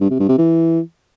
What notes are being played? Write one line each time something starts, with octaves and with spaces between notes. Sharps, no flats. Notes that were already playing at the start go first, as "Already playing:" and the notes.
G2
C3
G2
C3
E3